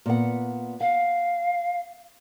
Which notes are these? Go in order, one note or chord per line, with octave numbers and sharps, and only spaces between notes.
A#2 B3 F#5
F5 F#5